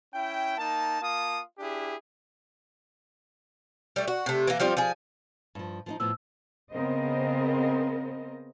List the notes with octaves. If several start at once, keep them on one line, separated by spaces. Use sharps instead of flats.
C#4 E4 G5
A#3 D#4 A5
A#3 F4 A5 D#6
D4 E4 G4 G#4
G3 A3
F#4
C3 A3
E3 A#3
F3 G3 C4 F4
F3 G#4
G2 F3
F3 B3 D#4
A2 F3 B3 E6
C#3 B3 C4 A#4 C5 D#5